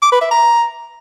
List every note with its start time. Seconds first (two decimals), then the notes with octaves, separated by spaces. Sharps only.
0.02 D6
0.11 B4
0.21 E5
0.31 A#5